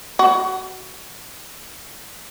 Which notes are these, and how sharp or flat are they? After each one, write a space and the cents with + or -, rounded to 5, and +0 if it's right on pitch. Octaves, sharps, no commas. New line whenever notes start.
F#4 +20